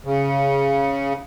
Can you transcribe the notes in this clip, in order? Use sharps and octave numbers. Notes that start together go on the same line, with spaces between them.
C#3